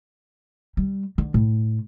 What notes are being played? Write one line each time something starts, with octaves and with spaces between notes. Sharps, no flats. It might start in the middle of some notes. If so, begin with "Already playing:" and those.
G3
D3
A2